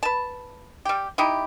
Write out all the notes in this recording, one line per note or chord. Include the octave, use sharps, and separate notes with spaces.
B4 A5
G3 G4
D#4 E4 G4